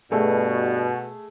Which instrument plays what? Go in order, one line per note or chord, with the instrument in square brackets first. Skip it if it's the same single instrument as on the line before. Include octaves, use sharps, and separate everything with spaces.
[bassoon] G2 [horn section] B2 [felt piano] A3 G#4